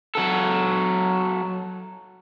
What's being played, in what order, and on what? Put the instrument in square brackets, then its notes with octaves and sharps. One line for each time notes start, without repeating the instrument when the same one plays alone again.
[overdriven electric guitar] F#3 A4